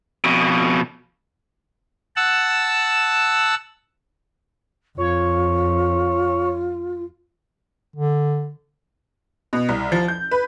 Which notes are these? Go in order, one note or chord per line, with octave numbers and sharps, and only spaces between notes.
F2 B2
F#5 A5 E6
F2 F4 C#5
D3
B2
C2
F3
G6
B4